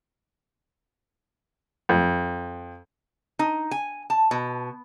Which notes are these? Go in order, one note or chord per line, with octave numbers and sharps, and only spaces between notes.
F2
D#4
G#5
A5
B2